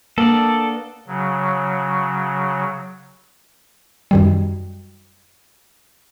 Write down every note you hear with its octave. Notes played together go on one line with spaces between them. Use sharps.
A#3 B3 D4 A4 D5
C#3 F#3
F#2 D#3 G3